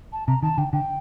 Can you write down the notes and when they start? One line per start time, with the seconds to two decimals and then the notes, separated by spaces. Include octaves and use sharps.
0.13 A5
0.28 C3 A#5
0.43 D#3 A5
0.58 D3 G5
0.73 D3 G5